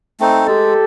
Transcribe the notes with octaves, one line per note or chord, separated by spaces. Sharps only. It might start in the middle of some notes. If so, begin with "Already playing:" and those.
A3 C4 D#4
G#3 G4 A4